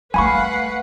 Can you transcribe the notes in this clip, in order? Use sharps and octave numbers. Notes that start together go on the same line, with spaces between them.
G3 A3 B4 F5 F#5 G#5 B5 C#6